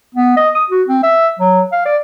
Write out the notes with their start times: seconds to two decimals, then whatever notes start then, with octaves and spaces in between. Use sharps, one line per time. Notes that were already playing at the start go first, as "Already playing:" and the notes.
0.15 B3
0.37 D#5
0.55 D#6
0.70 F#4
0.88 C4
1.03 E5
1.39 F#3
1.72 F5
1.86 D5